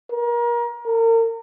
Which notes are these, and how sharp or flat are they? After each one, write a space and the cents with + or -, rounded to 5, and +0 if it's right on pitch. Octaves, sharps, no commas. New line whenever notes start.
A#4 +30
A#4 -35